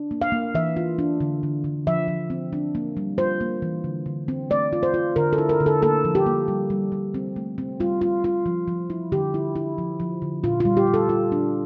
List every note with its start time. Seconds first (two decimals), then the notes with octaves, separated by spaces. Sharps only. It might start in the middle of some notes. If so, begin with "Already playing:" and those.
Already playing: D4
0.11 A#3
0.22 F5
0.32 A#3
0.55 E3 E5
0.76 F4
0.99 D4
1.21 D3
1.43 D3
1.64 D3
1.87 F3 E5
2.08 F3
2.30 C4
2.53 D4
2.75 A#3
2.97 G3
3.18 F4 C5
3.41 A#3
3.62 E3
3.84 D3
4.06 D3
4.28 C4
4.50 A3 D5
4.73 F4
4.83 C5
4.94 F4
5.16 D3 A#4
5.33 A4
5.38 E4
5.49 A#4
5.60 D3
5.66 A4
5.82 A#3 A4
6.05 F3
6.15 G4
6.26 A#3
6.48 G3
6.70 G3
6.92 G3
7.14 C4
7.36 A3
7.58 C4
7.80 G3 F4
8.01 F4
8.24 F4
8.46 F3
8.68 F3
8.90 E4
9.12 D3 G4
9.34 E4
9.56 E4
9.78 F3
10.00 F3
10.22 D3
10.44 A#2 F4
10.60 F4
10.65 G3
10.77 G4
10.87 G3
10.94 A4
11.09 F4
11.32 D4